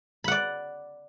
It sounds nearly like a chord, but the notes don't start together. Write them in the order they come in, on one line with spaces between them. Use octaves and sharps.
B5 F#5 D5